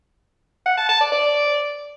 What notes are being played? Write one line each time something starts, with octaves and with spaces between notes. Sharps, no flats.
F#5
A5
A5
D5
D5